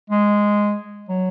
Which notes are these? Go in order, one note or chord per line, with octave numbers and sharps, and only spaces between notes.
G#3
F#3